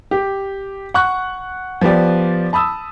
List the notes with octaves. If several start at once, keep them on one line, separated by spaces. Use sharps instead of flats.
G4
F#5 C#6 F#6
F3 B3 G4 D5
A5 B5 D#6 E6